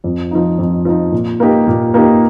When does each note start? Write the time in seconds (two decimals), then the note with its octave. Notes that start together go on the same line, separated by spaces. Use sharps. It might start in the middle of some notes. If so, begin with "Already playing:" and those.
0.04 F2
0.31 F3 D#4
0.58 F2
0.85 F3 D#4
1.12 A#2
1.40 A#3 D#4 G4
1.67 A#2
1.94 A#3 D#4 G4